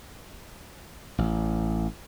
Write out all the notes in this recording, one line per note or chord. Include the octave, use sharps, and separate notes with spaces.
A1